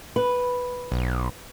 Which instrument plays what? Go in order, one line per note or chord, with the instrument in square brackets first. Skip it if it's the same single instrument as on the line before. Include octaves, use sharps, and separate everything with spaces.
[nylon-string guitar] B4
[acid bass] B1